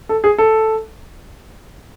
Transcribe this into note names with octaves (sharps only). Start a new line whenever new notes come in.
A4
G#4
A4